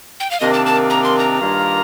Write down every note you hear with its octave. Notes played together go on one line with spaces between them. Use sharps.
G5
F5
C3 D#3 A#3 D4 D#5
A5
A5
A#5
C6
A#5
G2 D#3 A#3 F4